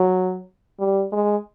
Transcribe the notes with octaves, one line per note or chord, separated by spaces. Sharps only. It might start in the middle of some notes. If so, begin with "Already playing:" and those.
Already playing: F#3
G3
G#3